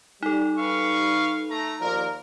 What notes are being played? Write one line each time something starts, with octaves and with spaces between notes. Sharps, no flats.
G3 D#4 A4
B4 F5 C#6
A3 A#5
D#2 F3 A#4 D5